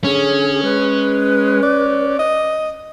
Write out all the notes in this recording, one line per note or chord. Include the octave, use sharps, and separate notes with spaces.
D3 C#4 G#4
G#3 B4
D5
D#5